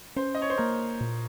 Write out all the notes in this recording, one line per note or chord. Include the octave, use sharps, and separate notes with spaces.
C#4 C5
D#5
C#5
C5
A#3 A#4
A#2